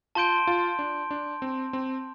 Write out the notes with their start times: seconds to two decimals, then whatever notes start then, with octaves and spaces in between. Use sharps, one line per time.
0.15 F4 A5 C6 G6 D7 G7
0.47 F4
0.79 D4
1.11 D4
1.42 C4
1.73 C4